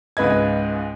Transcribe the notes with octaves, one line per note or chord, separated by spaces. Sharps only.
C#2 G#2 B4 D#5 G#6